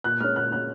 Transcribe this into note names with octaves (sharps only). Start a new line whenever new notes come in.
A#2 F#6
G#3 C#4 F6
A#2 F#6
G#3 C#4 F#6